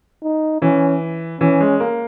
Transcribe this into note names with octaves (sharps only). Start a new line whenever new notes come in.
D#4
E3 C#4
E3 C#4
G#3
A#3